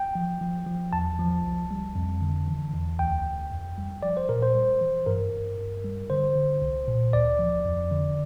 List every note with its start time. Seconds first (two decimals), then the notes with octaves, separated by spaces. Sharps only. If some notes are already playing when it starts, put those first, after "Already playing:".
Already playing: G5
0.15 F3
0.41 F3
0.66 F3
0.93 E2 A5
1.19 F3
1.44 C2
1.71 G3
1.95 F2
2.21 D3
2.48 E3
2.74 E2
2.99 D2 G5
3.26 D2
3.51 F2
3.78 G3
4.03 F3 D5
4.17 C5
4.29 A#2 A#4
4.42 C5
4.54 G3
4.81 E3
5.06 G2 A#4
5.32 G2
5.59 G2
5.84 G3
6.10 D3 C5
6.35 D3
6.62 C2
6.88 A#2
7.13 D2 D5
7.39 F3
7.65 F2
7.91 D3